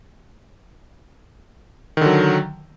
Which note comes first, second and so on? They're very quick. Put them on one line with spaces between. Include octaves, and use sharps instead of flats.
D#3 D3 F#3